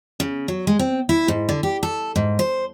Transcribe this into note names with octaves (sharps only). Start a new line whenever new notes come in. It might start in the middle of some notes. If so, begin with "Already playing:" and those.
C#3
F#3
G#3
C4
E4
G#2
D3
G4
A4
G#2
C5